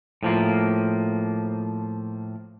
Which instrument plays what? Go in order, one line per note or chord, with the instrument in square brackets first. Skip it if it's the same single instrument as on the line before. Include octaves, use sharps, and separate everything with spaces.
[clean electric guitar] A2 F3 A#3